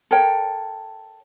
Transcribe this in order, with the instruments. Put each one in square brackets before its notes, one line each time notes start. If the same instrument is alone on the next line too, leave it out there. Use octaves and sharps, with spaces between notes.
[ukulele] A4 A#4 C#5 G5